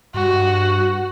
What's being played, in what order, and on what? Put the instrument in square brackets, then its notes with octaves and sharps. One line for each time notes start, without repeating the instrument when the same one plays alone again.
[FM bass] G2 [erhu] F#4